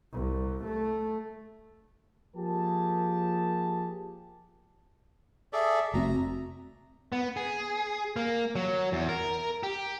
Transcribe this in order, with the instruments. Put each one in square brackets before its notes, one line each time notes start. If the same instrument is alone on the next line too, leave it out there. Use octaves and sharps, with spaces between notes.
[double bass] C2
A3
[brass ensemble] F3 A#3 G4 G#4 A#4 A5
[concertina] G#4 A4 D5 [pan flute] E5
[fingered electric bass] F1 A3 C4 [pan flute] F#4 [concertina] A#5
[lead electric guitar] B3
G#4
A#3
F#3
E2
A#4
G4